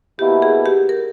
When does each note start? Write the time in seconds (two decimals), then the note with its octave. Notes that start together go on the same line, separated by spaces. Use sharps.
0.19 B2 A#3 E4 G4
0.42 G#4
0.66 G4
0.89 A#4